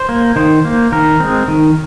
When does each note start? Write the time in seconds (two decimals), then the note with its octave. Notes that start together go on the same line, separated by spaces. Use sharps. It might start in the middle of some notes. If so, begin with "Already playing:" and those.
Already playing: C5
0.09 A#3
0.36 D#3 C5
0.65 A#3
0.92 D#3 A#4
1.20 G#3 C4
1.48 D#3